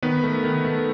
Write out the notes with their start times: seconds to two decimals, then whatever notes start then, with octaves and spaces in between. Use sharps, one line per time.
0.02 D#3 B3 B4
0.23 A3
0.44 D#3
0.65 A3